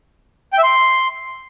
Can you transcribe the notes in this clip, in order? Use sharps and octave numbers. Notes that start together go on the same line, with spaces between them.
G5
E5
C6